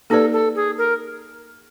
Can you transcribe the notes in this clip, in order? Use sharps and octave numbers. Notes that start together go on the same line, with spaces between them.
A#3 D#4 G4 A4 B4 D5
A4
G#4
A#4